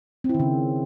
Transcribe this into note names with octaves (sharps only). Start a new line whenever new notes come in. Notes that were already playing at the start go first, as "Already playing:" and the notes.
C4
E4
D#3
C#3